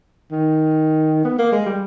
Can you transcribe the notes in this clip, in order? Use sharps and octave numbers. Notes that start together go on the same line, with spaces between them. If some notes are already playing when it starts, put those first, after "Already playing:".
D#3
B3
A#3
G#3
G3